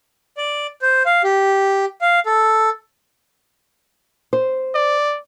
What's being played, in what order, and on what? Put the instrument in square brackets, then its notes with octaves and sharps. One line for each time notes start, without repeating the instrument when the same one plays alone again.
[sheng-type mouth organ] D5
C5
F5
G4
F5
A4
[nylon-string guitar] C5
[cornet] D5